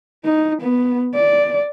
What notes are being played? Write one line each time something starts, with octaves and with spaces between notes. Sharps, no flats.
D#4
B3
D5